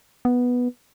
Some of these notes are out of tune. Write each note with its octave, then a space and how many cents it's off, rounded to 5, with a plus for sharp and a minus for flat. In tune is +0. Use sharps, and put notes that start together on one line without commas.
B3 -5